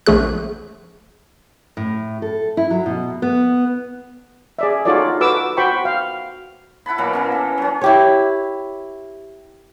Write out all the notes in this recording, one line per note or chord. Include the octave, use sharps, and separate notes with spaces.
A#1 A3 G#4 F#6
A2
A4
E4
F#3
B2
B3
G#4 D5 E5
D#4 F4 F#4 A4 C#5 D5
F#4 A4 B4 D6 E6
F#4 C5 G5 B5 C#6
F5
E4 F#5 A5 B5
B2 E3 F#3 A#3
E3 A#3 C#4
A4
F#3 C#4
E4 G4 C#5